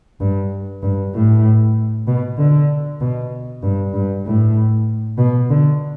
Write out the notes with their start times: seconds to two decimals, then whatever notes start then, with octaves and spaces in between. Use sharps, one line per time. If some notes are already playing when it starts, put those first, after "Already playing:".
0.20 G2
0.83 G2
1.14 A2
2.07 B2
2.38 D3
3.01 B2
3.63 G2
3.94 G2
4.26 A2
5.18 B2
5.50 D3